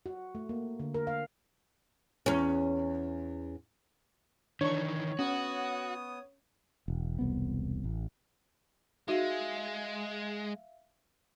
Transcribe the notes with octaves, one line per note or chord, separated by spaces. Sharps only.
F#4
A3
A#3
D3
A#4
F5
E2 C#4
D#3 E3 D4 C#5 C#6
B3 C#4 F#4 D#6
E1
E1 C2 B3
A1
G#3 D#4 F#4 E5 F5